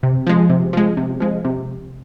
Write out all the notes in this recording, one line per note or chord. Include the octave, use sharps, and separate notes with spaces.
C3
F3 G#3
C3
F3 G#3
C3
F3 G#3
C3